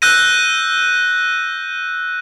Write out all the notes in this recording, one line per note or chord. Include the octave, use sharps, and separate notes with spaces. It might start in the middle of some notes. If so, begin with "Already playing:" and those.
E6 F#6 G6 A#6 D#7